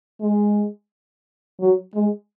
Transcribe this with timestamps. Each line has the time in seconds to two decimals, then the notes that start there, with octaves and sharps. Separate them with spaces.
0.21 G#3
1.60 F#3
1.95 G#3